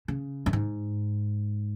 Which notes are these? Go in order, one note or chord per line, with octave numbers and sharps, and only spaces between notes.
C#3
F#2
G#2